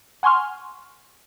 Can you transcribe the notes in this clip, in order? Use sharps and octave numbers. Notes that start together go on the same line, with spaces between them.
F#5 G#5 C6 C#6 F6